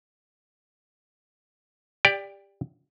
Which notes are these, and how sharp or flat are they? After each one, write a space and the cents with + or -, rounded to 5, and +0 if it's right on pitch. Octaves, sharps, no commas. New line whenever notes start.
G4 +20 D5 +0 G5 +0